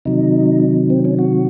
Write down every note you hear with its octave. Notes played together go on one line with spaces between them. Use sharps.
C3 D#3 F#3 D#4
C4
C#4
F#4